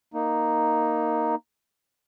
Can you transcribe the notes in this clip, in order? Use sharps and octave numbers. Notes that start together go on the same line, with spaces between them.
A#3 D#4